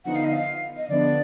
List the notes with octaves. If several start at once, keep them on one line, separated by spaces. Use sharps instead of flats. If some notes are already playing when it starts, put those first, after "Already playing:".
D3 F3 B3 D#4 F#5
F5
D#5
F5
D#5
D3 F3 B3 D4 D5